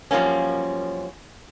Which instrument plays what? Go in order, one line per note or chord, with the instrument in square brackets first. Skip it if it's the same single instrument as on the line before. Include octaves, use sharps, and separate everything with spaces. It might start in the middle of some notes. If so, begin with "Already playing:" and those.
[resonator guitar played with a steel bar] F#2 F3 G3 A#3 C#4